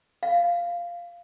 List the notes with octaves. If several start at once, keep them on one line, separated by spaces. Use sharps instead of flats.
F5